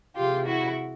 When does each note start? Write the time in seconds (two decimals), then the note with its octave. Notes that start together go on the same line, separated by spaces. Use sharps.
0.16 C3 E3 G#3 F4 G4
0.46 E4 F#4